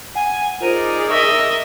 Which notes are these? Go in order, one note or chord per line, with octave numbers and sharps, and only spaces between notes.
F#5 G#5
D#4 F4 G#4 A#4 C5 D5 D#7
D#5 E5 C#6 A#6 B6